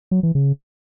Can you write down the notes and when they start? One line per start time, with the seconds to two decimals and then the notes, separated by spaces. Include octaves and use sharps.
0.11 F#3
0.23 E3
0.35 C#3